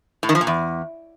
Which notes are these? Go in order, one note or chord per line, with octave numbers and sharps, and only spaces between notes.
A2
D#3
F3
A#2
E2